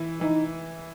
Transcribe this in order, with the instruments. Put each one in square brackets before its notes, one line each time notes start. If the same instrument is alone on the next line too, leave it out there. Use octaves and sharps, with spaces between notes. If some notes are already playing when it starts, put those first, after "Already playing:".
Already playing: [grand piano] E3 E4
[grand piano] E3 [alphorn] D#4